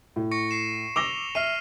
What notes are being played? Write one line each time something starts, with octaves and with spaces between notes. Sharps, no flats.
A2
C#6 A#6 C#7
C7 E7
D6 E6 A#6 F7 G7
E5 F6 C7 D#7